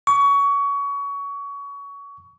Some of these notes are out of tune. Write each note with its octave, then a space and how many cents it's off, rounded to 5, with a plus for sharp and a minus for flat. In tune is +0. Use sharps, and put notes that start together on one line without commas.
C#6 +25